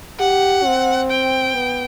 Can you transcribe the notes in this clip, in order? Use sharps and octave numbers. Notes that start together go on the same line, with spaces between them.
G4 F#5
C4
G5
B3